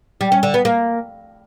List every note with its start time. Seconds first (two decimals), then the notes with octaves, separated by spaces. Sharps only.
0.21 G3
0.32 C#4
0.43 D3
0.54 B3
0.65 A#3